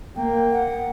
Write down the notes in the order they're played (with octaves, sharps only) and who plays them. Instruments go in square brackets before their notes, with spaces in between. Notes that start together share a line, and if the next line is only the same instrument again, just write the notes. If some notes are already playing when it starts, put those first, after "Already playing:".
[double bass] A#3 [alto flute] G5
[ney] F#5